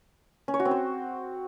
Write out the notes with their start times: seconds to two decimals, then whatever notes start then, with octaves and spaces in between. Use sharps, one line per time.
0.48 C#4
0.54 C#5
0.60 F#4
0.65 C4
0.71 C5